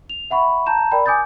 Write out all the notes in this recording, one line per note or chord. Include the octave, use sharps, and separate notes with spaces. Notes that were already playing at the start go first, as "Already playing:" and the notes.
F7
E5 F#5 B5 C#6
A5 A#5 G6 E7
A#4 D5 G5 B5
G#5 D6 D#6 G6 A6